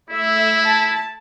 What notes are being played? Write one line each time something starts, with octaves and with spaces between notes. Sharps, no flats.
A3 E4 E5
A5